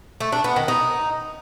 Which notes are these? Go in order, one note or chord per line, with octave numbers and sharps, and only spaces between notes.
A3
D4
B3
D#3
D#4